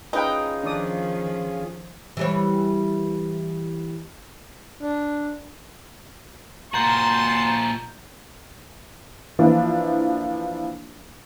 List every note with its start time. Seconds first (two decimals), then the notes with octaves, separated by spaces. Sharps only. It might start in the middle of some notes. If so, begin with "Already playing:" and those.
0.13 C#4 D#4 F4 G#4 A#4 B4 G5
0.63 D#3 F3 D4 D5 D#6
2.17 E3 G3 C#5
4.81 D4
6.74 A#2 F#4 A5 A#5 C6 G6
9.39 E3 F3 A#3 D4 E4 F4